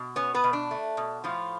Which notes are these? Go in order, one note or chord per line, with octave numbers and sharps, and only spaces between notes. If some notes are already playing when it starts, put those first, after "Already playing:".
Already playing: B2
B3 C#4 C#5
B3 B4
B2
D4
A3
B2
A2 F3 F4